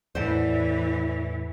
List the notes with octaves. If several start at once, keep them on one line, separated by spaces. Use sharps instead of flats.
E2 A2 E3 C5 D5 F#5